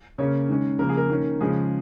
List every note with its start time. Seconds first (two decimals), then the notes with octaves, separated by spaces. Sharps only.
0.18 C#3 A#3 C#4 C#5
0.49 D#3 G#3 C#4
0.79 C#3 F3 A#3 A#4
0.89 G#4
0.97 A#4
1.10 D#3 A#3 C#4
1.41 C#3 F3 G#3 C#4 G#4